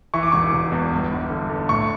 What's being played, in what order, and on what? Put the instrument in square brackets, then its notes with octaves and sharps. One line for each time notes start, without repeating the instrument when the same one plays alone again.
[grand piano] E3 C#6
D6
E1 C#6
E1
E2
G1
G1
D3
D3
A2 C#6